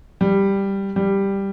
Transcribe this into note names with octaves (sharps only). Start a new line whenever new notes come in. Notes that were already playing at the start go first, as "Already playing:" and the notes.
G3
G3